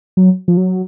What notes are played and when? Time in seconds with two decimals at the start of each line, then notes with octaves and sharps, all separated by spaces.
0.17 F#3
0.48 F3
0.57 F#3